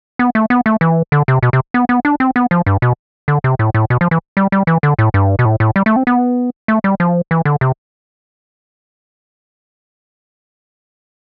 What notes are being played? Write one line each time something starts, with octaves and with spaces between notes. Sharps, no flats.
B3
A3
B3
A3
E3
D3
C3
B2
C3
B3
B3
D4
C4
B3
F3
G2
B2
D3
C3
A2
A2
B2
F3
E3
G3
G3
E3
D3
A2
G2
B2
A2
A2
G3
A3
C4
B3
A3
G3
F3
E3
D3
C3